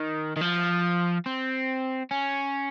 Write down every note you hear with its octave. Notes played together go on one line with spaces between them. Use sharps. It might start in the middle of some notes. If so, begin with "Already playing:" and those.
Already playing: D#3
D#3
F3
C4
C#4